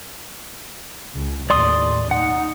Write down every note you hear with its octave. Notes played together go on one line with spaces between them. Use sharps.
C#2
D#2 A2 D5 C6 D#6
D#4 F#5